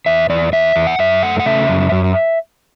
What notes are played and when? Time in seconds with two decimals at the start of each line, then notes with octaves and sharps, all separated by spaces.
0.06 E2 E5
0.30 E2 D5
0.53 E2 E5
0.76 E2
0.87 F#5
0.99 F#2 E5
1.23 A3 F#5
1.40 F#5
1.46 C#3 E5
1.69 F#2
1.92 F#2